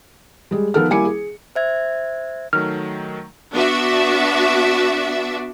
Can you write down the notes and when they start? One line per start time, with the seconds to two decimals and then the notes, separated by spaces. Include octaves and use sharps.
0.51 G3 G#3
0.74 D#3 F3 B3 A4 A#4 F6
0.90 G3 A#3 E4 G#5 D6 C#7
1.05 G#4
1.55 C5 E5 G#6
2.53 D#3 F#3 A3 F6
3.53 B3 D4 F#4 D5 E5